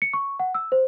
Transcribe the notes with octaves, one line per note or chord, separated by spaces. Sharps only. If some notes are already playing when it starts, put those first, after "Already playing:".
C#7
C#6
F#5
E6
C5